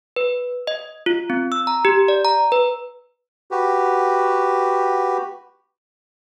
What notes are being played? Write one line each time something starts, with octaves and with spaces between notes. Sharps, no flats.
B4
D#5
F4
C4
E6
A#5
G4
D5
A#5
B4
F#4 G4 B4